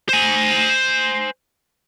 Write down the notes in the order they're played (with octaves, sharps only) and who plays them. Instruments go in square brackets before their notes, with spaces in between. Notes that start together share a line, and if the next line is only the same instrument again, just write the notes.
[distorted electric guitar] C5 G#5